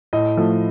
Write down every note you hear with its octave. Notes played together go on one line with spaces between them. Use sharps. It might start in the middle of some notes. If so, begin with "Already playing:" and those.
A2 D#5
F3 A3